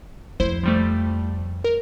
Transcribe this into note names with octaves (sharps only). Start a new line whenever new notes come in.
F2 E4 C5
F3 G3 A3
A#4